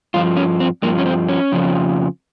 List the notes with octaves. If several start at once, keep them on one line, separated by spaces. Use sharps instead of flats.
G2 F3 F4
C#4
C4
G2 F3 A#3
C#4
C4
C#4
F2 C#3 F3